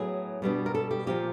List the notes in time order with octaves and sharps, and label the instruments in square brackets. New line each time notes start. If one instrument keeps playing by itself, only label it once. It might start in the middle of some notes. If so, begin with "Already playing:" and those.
Already playing: [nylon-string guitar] A2 F#3 B3 G#4
B2 G3 B3 D4
A#4
A4
G4
A#2 F3 A#3 G4